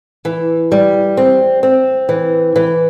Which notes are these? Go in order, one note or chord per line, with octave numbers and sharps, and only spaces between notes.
E3
G3
C4
C4
E3
E3